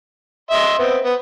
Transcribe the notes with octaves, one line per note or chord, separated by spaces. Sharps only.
D#5 E5 C6
B3 C4
B3